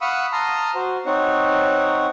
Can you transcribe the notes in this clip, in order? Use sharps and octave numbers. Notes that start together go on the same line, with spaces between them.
F5 F#5 B5 C#6 D#6 E6
A5 A#5 C6 D#6 F6
F#4 C5
C4 D#4 C#5 F#5